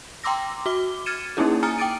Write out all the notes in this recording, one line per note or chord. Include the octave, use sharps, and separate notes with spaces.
G5 A#5 C6 D6 E6 A#6
F#4 D6 G7
F6 G#6 A6 C#7 D#7 E7
A#3 C#4 D#4 E4 G#4
G#5 A#5 D#6 F6 A6 C#7
G5 D6 D#6 A6 D7 D#7